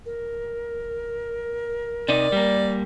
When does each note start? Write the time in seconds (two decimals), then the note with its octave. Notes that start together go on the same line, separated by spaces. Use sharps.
0.05 A#4
2.09 C3 D#4 D5
2.32 G3 A#3